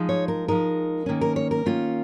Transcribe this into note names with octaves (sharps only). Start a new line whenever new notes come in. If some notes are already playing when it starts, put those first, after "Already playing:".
Already playing: F3 G#3 D#4
C#5
A#4
F3 G#3 D#4 A#4
D#3 A#3 C#4
A#4
C#5
A#4
D#3 A#3 C#4 F4